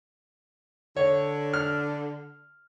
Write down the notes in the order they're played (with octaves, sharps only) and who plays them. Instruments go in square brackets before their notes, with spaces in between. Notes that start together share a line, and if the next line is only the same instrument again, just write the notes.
[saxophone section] D3 [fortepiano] C#5
[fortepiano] F6